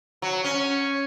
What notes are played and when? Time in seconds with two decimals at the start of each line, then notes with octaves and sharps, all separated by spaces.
0.22 F#3
0.44 C#4